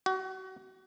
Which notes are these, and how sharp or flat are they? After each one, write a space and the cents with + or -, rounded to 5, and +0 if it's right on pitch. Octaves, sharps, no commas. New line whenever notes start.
F#4 +30